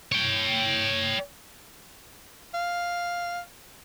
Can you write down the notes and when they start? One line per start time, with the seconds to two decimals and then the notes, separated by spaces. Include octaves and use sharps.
0.12 C#5 G5
2.54 F5